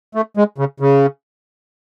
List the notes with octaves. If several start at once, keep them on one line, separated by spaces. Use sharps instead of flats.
A3
G#3
C#3
C#3